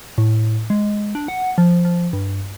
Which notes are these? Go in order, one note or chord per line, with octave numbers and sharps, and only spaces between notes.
A2
G#3
D4
F#5
F3
F3
G2